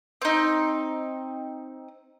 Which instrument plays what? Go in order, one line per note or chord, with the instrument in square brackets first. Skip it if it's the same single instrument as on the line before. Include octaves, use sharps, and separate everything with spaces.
[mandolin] C4 D#4